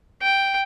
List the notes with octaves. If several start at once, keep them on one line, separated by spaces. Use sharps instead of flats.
G5